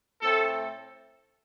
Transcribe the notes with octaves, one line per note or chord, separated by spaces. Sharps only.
A2 A3 C4 A4